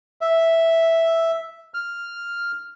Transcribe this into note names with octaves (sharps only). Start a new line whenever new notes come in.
E5
F6